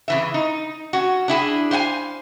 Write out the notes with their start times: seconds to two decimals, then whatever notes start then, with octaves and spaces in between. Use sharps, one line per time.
0.08 C#3 E3 E5
0.34 D#4
0.93 C#4 F#4
1.28 D4 E4 G4 G#4
1.71 C5 F5 F#5 G#5